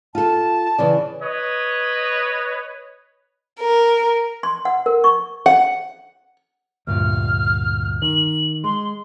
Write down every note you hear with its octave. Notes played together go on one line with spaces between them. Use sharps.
F4 A4 A5
C#3 E3 D5
B4 C#5 D#5
A#4
C6
F#5
A#4
C#6
F#5
D2 G2 A#2 F6
D#3 F#7
G#3 C6